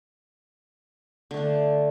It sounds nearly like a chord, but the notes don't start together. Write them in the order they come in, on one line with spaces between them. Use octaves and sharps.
D3 A3 D4